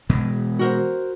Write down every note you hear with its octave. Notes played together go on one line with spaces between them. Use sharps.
B2 E3 G#3
F#4 A#4 C5